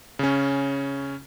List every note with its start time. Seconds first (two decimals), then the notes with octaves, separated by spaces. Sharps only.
0.19 C#3 C#4